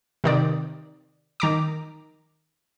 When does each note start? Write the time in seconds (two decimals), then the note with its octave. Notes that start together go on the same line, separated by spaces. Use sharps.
0.24 C3 D#3 D5
1.40 D#3 A#5 D6